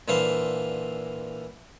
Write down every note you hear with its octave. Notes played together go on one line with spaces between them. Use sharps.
A#2 D3 E3 C5 F5